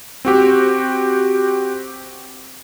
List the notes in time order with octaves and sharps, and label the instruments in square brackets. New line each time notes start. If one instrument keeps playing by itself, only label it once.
[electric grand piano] C4 F#4 G4